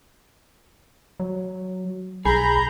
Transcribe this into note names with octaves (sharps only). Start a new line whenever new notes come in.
F#3
B1 G#4 A#5 B5 G6